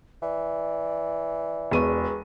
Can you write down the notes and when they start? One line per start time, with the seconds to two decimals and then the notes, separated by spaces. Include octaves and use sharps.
0.22 E3 D5
1.71 E1 G#4 B4 C#6 D#7